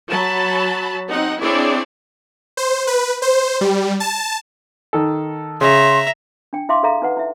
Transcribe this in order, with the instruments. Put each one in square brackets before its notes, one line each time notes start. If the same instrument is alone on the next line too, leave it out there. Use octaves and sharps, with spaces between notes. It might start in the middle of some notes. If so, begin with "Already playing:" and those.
[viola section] F#3 A5 B5
C4 D#4 F#5
C4 D4 E4 G#4 C#5 D5
[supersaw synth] C5
B4
C5
G3
A5
[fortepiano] D#3 A4
[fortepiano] C#3 [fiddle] E5 A#5 [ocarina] C6
[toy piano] D4 G5
E4 E5 F5 C6 D6
G#4 A4 D5 E5 F5 A#5
D#4 B4 F#5
E4 E5